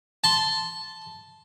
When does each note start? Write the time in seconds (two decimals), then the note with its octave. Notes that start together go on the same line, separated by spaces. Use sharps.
0.24 A5 C6